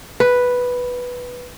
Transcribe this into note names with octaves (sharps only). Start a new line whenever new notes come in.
B4